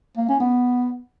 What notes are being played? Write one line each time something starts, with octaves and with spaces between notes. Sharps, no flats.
A#3
C#4
B3